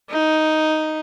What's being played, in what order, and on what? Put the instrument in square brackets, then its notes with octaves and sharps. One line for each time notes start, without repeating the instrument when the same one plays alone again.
[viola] D#4